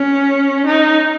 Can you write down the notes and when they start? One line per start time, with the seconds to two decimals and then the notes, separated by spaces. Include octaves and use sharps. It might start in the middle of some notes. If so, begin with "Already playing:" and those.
Already playing: C#4
0.67 D#4